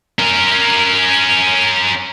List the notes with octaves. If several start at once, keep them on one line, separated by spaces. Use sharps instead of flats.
C#4 A#4